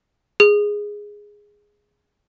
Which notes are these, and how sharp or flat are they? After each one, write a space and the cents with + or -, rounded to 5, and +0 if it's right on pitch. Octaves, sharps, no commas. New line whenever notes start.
G#4 -5